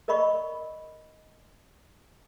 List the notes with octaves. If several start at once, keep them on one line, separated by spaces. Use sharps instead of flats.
A#4 D5 D#5 B5 C#6